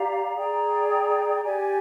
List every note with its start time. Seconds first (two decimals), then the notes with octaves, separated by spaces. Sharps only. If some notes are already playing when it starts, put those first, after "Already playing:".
Already playing: G4 D5 F5 A#5
0.36 G#4 D5 G5 A#5
1.44 G4 D5 G#5